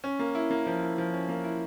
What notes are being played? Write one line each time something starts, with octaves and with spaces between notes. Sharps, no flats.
C#4
A#3
E4
A#3
F3
E4
F3
C#4
A#3
E4